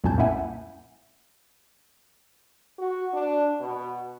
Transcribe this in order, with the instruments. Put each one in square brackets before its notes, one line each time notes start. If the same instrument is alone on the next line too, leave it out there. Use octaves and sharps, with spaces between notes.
[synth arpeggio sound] C2 F2 A#2 G#5 A5 G6
A#3 C#4 E4 E5 F#5 G#5
[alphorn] F#4
D4
B2